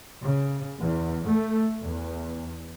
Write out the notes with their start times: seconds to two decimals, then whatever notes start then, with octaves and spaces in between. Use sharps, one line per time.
0.22 C#3
0.80 E2
1.27 A3
1.78 E2